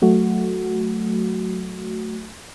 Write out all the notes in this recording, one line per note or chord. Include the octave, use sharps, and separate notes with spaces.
F#3 A3 F#4